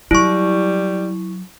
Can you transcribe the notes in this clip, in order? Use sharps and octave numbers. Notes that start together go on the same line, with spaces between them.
F#3 G3 E4 C#6